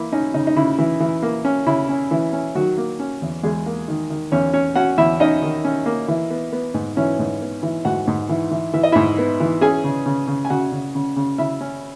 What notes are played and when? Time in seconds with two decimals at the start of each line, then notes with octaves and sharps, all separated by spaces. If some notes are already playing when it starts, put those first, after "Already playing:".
Already playing: E3 A#3 E4
0.12 C#4 D#4
0.34 C#3 D#4
0.47 D#4
0.56 C#3 E4
0.78 E3
1.00 E3
1.23 A#3
1.45 C#4
1.67 C#3 E4
1.89 C#4
2.11 E3
2.33 C#4
2.55 D#3 F#3 F#4
2.78 A#3
3.00 C#4
3.22 E2
3.43 E2 G#3 G#4
3.66 A#3
3.88 D#3
4.10 D#3
4.32 E2 C#4 C#5
4.53 C#4 C#5
4.76 C#4 F#4 F#5
4.98 E2 E4 E5
5.20 C#4 D#4 D#5
5.42 D#3
5.65 C#4
5.86 A#3
6.08 E3
6.30 B3
6.52 B3
6.74 G#2
6.97 E3 C#4 C#5
7.19 G#2
7.42 B3
7.63 E3
7.85 G#2 F#4 F#5
8.07 G#2
8.29 E3
8.51 E3
8.74 E3 E5
8.83 D#5
8.92 G#2 E4 E5
9.18 B3
9.40 E3
9.61 C#4 G#4 G#5
9.84 C#3
10.06 C#3
10.28 C#3
10.45 G#5
10.50 C#3 F#4 F#5
10.72 C#3
10.95 C#3
11.16 C#3
11.38 C#3 E4 E5
11.61 C#4